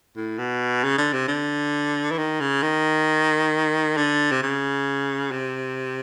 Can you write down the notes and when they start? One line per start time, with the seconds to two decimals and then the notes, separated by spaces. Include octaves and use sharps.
0.16 A2
0.39 B2
0.83 C#3
0.98 D3
1.13 C3
1.28 D3
2.11 E3
2.18 D#3
2.40 C#3
2.62 D#3
3.97 D3
4.31 C3
4.42 C#3
5.31 C3